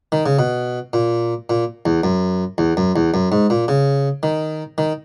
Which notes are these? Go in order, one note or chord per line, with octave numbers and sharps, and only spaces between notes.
D#3
C#3
B2
A#2
A#2
E2
F#2
E2
F#2
E2
F#2
G#2
A#2
C#3
D#3
D#3